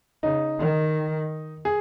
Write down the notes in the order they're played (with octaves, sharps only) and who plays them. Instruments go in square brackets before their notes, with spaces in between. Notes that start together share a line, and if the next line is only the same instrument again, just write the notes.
[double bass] C#3 [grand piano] D#4
[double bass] D#3
[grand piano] G#4